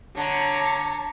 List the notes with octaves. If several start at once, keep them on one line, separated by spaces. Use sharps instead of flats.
D3 C#5 A5 A#5